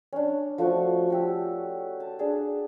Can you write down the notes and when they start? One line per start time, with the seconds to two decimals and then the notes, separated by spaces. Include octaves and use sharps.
0.13 C#4 D4
0.58 F3 A3 F#4 C#6
1.10 F#4 G4 E6
2.00 A5
2.19 D4 G#4 A5